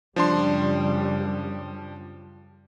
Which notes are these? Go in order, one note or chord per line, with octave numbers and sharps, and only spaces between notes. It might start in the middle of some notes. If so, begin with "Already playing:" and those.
F#2 C#3 F3 G3 D4 C6